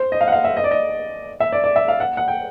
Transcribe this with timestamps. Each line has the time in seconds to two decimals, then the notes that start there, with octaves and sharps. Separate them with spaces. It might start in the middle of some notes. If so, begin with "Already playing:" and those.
Already playing: C5
0.12 D#5
0.21 F5
0.28 F#5
0.32 F5
0.44 E5
0.57 D#5
0.64 D5
0.71 D#5
1.40 E5
1.52 D5
1.64 D5
1.76 E5
1.88 F5
2.00 F#5
2.17 F#5
2.28 G5